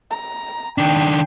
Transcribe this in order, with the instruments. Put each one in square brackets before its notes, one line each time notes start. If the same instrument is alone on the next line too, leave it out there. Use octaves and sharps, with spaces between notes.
[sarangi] A#5
[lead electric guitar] D#3 D4 [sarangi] G5